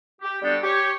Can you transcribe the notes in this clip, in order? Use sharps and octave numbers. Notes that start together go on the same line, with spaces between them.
G4
G3 B3 D4 F#4 G4 A4
G4 C#5